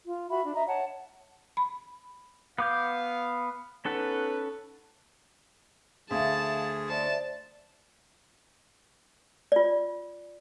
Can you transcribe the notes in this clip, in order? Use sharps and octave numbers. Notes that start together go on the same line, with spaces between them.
F4
F#4 E5 B5
D4
D#5 E5 A#5
C#5 F#5 A5
B5
B3 F5 D6 G6
B3 C#4 D#4 A4 B4 F#5
D2 G#4 E5 F5 A5
C5 D5 E5 A5
F4 D5